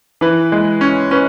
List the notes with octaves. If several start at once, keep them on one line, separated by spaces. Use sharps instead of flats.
E3 B4
G#3
C#4
C#4 B4